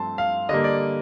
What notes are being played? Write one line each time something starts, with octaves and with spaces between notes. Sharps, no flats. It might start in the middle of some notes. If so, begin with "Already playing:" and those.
Already playing: G2 F3 A3 C4 A5 C6
F5
D3 G3 A#3 D#5
D5